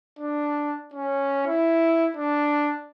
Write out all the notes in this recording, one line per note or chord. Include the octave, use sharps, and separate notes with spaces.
D4
C#4
E4
D4